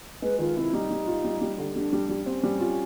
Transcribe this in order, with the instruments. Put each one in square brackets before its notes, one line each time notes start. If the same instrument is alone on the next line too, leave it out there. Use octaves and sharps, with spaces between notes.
[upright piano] G#3 [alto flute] B4
[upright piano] D#3 [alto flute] F4
[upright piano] C3 [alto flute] E4
[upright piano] G3 [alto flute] D#4
[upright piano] G3
F4
G3
G3
D3
[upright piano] G3 [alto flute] D4
[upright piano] G3
G3
[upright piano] C4 [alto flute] C#4
[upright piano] G3
F4